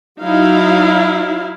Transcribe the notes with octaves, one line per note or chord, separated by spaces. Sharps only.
F#3 D#4 E4 F5